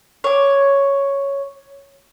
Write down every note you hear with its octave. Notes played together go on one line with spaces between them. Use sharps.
C#5 D6